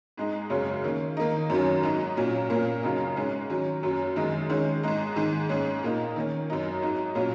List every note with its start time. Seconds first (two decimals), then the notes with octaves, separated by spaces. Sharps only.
0.17 G#2 G#3 D#4
0.50 F#2 C#3 G#3 C#4
0.84 D#3 A#3 C#4
1.17 D#3 A#3 D#4
1.50 F#2 D#3 F#3 C#4
1.83 G#2 F#3 D#4
2.17 A#2 F#3 C#4
2.50 A#2 A#3 C#4
2.83 F#2 C#3 F#3 D#4
3.16 G#2 G#3 C#4
3.49 D#3 F#3 C#4
3.83 F#2 F#3 C#4
4.16 F#2 D#3 G#3 D#4
4.50 D#3 G#3 C#4
4.83 G#2 G#3 D#4
5.16 G#2 D#3 G#3
5.49 G#2 G#3 C#4
5.83 A#2 A#3 D#4
6.16 D#3 A#3 C#4
6.50 F#2 F#3 D#4
6.82 G#2 F#3 D#4
7.15 A#2 F#3 C#4